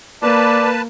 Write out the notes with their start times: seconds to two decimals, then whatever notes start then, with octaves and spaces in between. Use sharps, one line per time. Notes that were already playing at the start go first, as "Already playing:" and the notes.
0.23 A#3 B4 D5 A5